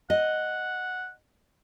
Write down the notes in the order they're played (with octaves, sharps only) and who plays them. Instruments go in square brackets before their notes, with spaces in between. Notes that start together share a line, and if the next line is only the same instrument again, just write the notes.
[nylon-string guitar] D#5 [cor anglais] F#5